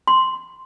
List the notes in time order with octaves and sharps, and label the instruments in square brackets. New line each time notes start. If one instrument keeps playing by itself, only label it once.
[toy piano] C6